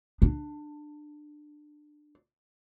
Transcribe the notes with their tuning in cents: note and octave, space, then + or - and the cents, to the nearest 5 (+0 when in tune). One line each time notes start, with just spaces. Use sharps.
D4 +20